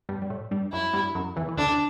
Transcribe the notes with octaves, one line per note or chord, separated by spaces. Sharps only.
G2 G3
G3
A2 A3
G2 G3
F#2 F#3 E4
G2 G3
F#2 F#3
E2 E3
E3
D2 D3 D4